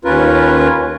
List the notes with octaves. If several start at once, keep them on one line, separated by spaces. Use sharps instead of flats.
D#2 C#4 F4 A#4 B4